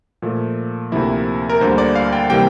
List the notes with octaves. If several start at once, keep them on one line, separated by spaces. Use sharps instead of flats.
A#2 F3 A3
D2 C3 F3 A#3 E4
A#4
D2 D3 G3 A#3 C5
D5
F5
G5
C3 E3 G3 A#3 G5